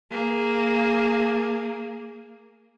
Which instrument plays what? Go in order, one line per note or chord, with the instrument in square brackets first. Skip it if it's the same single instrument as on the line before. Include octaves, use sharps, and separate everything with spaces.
[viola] A#3 G#4